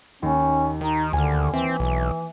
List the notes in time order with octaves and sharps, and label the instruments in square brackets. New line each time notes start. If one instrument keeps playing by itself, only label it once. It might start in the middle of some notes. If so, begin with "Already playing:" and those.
[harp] D#2 [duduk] C#4
[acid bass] D#3 [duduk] D#4
[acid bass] D2 [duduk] D3 [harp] G#5 F6
[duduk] E3 [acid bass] C4 [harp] E5
[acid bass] B1 [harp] G#5